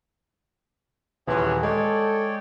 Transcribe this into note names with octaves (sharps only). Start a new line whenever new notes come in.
D#1 E3 C#4 G#4 C#5 C6
G#3 A4 C#5 D5 G5